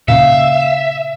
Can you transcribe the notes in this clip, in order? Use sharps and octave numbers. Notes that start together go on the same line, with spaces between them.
A#2 C#3 E5 F5